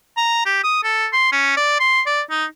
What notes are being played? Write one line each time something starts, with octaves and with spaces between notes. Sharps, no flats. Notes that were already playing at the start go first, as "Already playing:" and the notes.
A#5
G4
D#6
A4
C6
C#4
D5
C6
D5
D#4